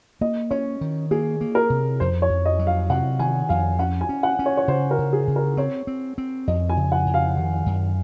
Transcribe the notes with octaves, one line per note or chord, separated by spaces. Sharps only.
A#3 D#5
C#4 C#5
D#3
A#3 G#4
A#3
A#4
C3
F2 C5
C#5
F2
D#5
F#3
F5
C3 F#5
D#3 G#5
F2 F5
C#4 F#5
G#5
C#4
F#5
C#4
C#5
C#5
C#3 C5
A#4
C#3
G#4
C#3
A#4
C4 C#5
C4
C4
F2 D#5
G#5
C#3
F#5
F2
F5
D#3
F#2